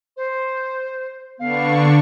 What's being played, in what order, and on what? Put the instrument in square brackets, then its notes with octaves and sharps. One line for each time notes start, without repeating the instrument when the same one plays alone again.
[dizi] C5
[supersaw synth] D3 D4 C#6 [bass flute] B3 [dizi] F5